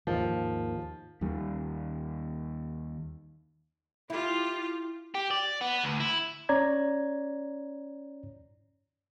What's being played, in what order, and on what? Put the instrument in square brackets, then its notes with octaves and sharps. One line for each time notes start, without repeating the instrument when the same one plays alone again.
[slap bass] D#2 G#2 D#3 [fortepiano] F3
[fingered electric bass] D#2 D#3 G3
[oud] E4 [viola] F4 G4
[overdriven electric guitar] G4
D5
B3
D2
E4
[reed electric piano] C#4 C#5 D5 A#5 G#6